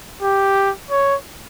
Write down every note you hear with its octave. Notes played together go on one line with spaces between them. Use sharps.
G4
C#5